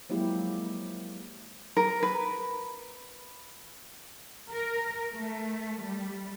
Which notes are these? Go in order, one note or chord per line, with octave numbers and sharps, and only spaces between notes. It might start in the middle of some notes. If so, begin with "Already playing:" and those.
F3 F#3 G#3 A#3 E4 G4
A#4
B4
A#4
A3
G3